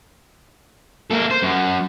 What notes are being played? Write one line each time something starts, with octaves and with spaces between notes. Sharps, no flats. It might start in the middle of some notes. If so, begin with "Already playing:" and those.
A#3 A4
C5
F#2